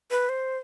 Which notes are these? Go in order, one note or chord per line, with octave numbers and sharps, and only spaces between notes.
B4
C5